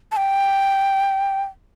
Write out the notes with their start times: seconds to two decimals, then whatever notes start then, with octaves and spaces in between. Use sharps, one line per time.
0.12 A5
0.17 G5